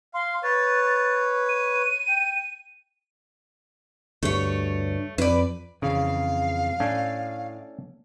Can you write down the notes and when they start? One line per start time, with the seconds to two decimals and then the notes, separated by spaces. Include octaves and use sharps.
0.14 F5 C6
0.43 B4 C#5 A6
1.49 D#7
2.08 G5
4.23 D2 G2 A3 C#5
5.18 F2 B4 D5
5.82 F2 C#3 E3 F5
6.80 A2 A3 C#4 D4